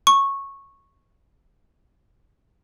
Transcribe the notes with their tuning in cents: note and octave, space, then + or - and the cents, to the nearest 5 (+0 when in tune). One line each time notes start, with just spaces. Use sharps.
C#6 -10